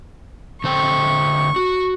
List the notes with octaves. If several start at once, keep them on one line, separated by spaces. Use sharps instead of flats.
D3 C5 G5 C#6
F#4